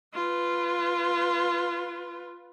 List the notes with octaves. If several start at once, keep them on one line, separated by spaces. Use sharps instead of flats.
F4 B4